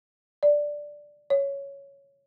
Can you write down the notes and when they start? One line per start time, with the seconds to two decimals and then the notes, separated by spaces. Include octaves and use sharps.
0.43 D5
1.30 C#5